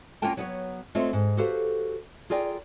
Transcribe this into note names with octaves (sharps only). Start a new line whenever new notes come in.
A#3 C#4 F4 A#4 G5 A5
F#3 B3 C#5
A3 C4 F4 C#5 D#5
G#2
F#4 G4 A4 B4 C5 F5
F4 G#4 A#4 D5 G5